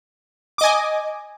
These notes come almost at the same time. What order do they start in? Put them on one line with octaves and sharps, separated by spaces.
D6 D#5 G#5